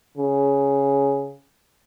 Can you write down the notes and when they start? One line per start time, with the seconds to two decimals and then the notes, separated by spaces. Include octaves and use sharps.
0.17 C#3